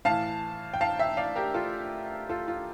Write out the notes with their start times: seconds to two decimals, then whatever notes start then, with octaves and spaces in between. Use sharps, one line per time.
0.05 A2 E3 F5 A5
0.74 G5
0.81 F5 A5
0.99 E5 G5
1.17 D5 F5
1.36 G4 A#4
1.54 F4 A4
2.29 F4 A4
2.48 F4